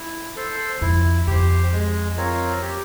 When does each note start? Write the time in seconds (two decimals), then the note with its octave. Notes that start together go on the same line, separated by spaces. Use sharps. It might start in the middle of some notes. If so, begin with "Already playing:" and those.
Already playing: E4
0.36 A4 C5
0.81 F2 E4
1.27 F2 G4 C5
1.72 G#3
2.17 C4 F4 A#4 C#5
2.62 G4